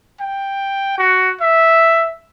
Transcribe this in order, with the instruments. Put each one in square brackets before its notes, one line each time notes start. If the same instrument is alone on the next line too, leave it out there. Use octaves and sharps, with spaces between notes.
[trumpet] G5
F#4
E5